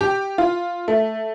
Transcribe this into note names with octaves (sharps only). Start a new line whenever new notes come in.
G4
F4
A3